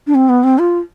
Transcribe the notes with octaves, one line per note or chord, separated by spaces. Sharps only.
D4
C4
B3
C4
F4